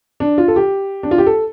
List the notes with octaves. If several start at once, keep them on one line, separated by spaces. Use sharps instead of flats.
D4
F4
A4
G4
D4
F4
G4
A4